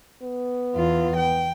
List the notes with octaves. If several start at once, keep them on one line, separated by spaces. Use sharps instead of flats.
B3
E2 F4
G5